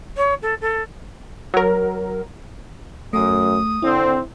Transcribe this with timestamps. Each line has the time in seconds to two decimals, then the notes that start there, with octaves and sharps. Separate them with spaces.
0.17 C#5
0.42 A4
0.61 A4
1.54 F#3 A#4
3.13 F#2 A3 D#6
3.82 D3 C4 E4